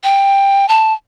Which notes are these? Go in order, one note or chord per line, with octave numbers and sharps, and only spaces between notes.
G5
A5